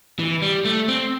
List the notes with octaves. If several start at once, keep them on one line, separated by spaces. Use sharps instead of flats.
E3
G3
A3
C4